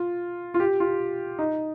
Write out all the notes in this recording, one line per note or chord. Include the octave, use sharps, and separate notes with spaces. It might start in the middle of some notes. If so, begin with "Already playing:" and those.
Already playing: F4
F4
G4
F4
D#4